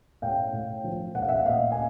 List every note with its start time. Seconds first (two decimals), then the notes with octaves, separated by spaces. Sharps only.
0.22 A2 F5 G5
0.53 A2
0.84 F3
1.14 A2 F#5
1.22 F5
1.28 E5 F#5
1.46 A#2 D#5 F5
1.72 G#5